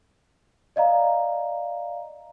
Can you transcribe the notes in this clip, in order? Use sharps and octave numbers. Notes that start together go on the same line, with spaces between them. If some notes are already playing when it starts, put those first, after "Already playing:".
D5 D#5 F5 A#5